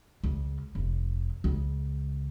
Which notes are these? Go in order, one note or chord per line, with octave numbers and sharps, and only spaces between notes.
C#2
F1
C#2